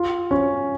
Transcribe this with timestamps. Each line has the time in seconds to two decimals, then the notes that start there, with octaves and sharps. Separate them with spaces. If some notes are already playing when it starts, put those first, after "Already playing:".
Already playing: F4
0.31 C#4